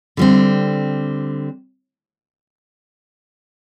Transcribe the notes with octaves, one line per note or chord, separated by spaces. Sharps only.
D3 G3 C4